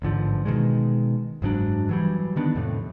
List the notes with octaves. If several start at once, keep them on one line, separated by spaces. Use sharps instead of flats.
A1 G#2 D3 F3
B2 D#3 G#3
F#1 G#2 F#3 D4
E3 F#3 G3
D3 D#3 B3 D4
F2 A2 C3 A3